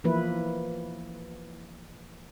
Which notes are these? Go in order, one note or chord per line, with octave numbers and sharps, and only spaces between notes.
E3 F3 A#3 E4 B4